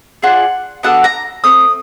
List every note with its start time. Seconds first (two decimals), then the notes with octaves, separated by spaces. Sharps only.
0.22 D4 F4 G#4 F#5
0.83 B3 D4 F#4 A4 F#5
1.04 A#5
1.44 A3 C4 D#6